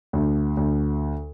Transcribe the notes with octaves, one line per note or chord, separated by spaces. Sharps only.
D2
D2